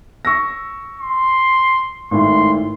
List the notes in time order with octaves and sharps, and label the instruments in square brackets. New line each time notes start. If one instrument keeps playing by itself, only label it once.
[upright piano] C#6 E6 A#6
[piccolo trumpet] C6
[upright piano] G#1 A2 [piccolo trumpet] C6